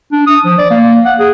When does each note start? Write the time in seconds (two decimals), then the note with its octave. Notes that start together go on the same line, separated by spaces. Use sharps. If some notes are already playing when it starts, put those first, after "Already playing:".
0.12 D4
0.27 D#6
0.45 F3
0.58 D5
0.71 A#3
1.05 F#5
1.19 G#4